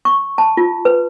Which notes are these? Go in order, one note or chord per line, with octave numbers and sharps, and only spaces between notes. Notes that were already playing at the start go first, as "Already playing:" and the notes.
C#6
A5
F4
B4